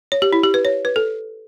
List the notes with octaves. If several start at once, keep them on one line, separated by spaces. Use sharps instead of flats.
C#5
G4
E4
G4
B4
C#5
B4
A4